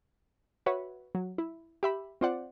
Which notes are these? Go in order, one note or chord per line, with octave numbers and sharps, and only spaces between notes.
F#4 B4 C#5 E5 F#5
F#3
E4
G4 E5 B5
C4 F4 C5 D5 F#5